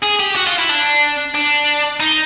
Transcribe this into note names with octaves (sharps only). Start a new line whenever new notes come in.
G#4
G4
F#4
F4
E4
D4
D4
D#4